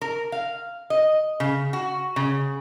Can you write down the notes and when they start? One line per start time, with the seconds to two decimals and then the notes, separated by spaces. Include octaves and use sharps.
0.01 A#4
0.32 F5
0.90 D#5
1.40 C#3
1.73 F#4
2.16 C#3